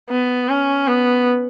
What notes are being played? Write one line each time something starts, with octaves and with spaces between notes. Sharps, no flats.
B3
C#4
B3